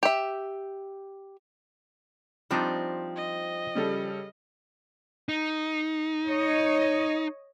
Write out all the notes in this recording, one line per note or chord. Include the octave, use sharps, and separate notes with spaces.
G4 E5
F3 G3 C4 D4 D#4
D#5
C#3 G3 A4
D#4
C#5 D#5